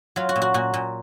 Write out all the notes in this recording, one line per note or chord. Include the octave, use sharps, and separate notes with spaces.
F#3 F4
F#4
A#2
F#4
A#2 F#4
A#2